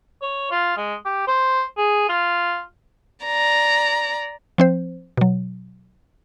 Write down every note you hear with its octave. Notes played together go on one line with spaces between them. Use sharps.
C#5
F4
G#3
G4
C5
G#4
F4
D5 A#5
F3 C4 C5
B2 F#3